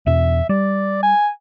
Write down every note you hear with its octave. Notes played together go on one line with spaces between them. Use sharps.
E2 B2 E5
G3 D5
G#5